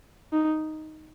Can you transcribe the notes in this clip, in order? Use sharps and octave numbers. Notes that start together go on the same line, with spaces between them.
D#4